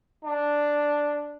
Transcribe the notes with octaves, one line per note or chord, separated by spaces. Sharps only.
D4